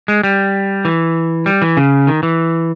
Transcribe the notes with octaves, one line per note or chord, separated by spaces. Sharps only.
G#3
G3
E3
G3
E3
C#3
D#3
E3